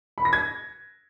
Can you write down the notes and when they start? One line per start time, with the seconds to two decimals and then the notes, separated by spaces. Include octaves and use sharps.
0.18 B5
0.25 A#6
0.33 G#6